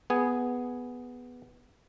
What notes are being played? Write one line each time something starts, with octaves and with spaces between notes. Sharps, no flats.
B3 G#4